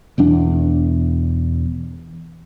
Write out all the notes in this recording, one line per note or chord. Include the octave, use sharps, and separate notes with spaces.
E1 E2 D4